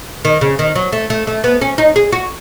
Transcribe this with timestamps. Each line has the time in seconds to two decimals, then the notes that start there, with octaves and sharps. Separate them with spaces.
0.25 D#3
0.41 C#3
0.59 D#3
0.75 F#3
0.92 A3
1.10 A3
1.27 A3
1.44 B3
1.61 C#4
1.78 D#4
1.96 G#4
2.12 F#4